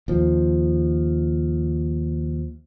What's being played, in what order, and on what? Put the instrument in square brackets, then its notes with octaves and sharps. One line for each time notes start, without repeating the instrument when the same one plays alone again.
[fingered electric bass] D#2 F3